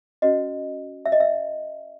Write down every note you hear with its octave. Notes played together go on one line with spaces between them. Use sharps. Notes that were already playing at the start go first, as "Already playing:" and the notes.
C#4 F#4 B4 D#5
E5
D#5
E5